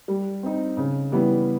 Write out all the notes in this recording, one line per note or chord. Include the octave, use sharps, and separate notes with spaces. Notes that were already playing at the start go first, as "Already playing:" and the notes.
G3
C4 D#4
C#3
E3 G3 B3